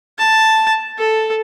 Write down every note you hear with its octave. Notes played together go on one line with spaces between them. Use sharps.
A5
A4